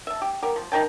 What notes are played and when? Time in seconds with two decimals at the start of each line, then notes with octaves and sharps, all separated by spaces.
0.07 E5 A5
0.22 G4
0.43 B3 G4 A#4
0.56 F3
0.72 D#4 A#4 G5 A5